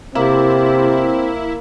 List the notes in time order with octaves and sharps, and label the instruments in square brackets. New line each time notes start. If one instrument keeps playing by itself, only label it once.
[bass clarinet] C3 [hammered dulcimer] A#3 [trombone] C4 [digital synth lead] E4